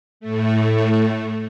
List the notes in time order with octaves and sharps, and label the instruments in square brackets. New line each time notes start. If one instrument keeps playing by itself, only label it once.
[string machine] A2 A3